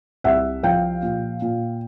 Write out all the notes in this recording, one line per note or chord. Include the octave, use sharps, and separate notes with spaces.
C2 E5 F#5
F3 F5 G5
A#2
A#2